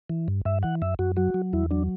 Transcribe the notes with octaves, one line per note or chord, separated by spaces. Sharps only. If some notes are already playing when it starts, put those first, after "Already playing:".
E3
G2
G2 E5
E3 F#5
F#2 E5
F#2 F#4
F#3 F#4
F#3
E2 E4
F#3 D4